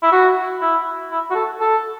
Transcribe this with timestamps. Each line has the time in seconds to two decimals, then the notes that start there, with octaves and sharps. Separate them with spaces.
0.03 E4
0.12 F#4
0.61 E4
1.11 E4
1.30 F#4
1.35 A4
1.60 A4